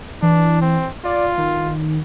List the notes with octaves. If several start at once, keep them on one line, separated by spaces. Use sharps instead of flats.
E3 D4
C4
F4 D5
D#3